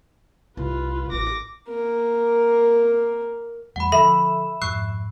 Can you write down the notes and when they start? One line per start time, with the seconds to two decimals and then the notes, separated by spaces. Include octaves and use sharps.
0.57 C2 F4 B4
1.11 A1 D6 A#6
1.68 A#3 A#4
3.76 E2 G3 A3 F#5 B5
3.92 D3 F3 D4 A4 E5 B5
4.62 F2 G#2 C#6 E6 F#6 C7